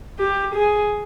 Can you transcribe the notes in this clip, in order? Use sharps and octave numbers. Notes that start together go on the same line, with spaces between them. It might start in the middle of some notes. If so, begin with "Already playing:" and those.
G4
G#4